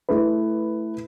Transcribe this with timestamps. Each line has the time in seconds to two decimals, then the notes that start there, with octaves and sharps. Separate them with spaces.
0.09 A3 E4 B4